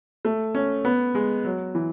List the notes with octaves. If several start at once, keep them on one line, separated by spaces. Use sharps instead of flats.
A3
C#4
B3
G#3
F#3
E3